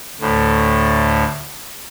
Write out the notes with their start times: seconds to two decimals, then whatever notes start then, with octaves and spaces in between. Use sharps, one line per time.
0.20 D2 A2